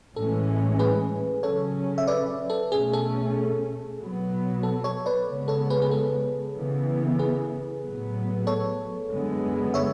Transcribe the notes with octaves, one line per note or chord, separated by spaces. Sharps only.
A2 E3 G#3 C#4 A4
G#4 B4
C#3 F#3 C#4 A4 C#5
E5
B4 D5
A4
B2 A3 C#4 G#4
A4
B2 F#3 B3
A4
A4 C#5
B4 D5
C#3 G#3 B3
A4 C#5
G#4 B4
G#4
A4
C#3 E3 B3
G#4 B4
A2 F#3 B3
A4 C#5
F#2 D3 G#3 B3
C#5 E5